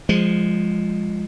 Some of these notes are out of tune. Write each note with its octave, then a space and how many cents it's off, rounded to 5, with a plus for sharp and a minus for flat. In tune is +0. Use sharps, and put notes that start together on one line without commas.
F3 +0 G#3 -15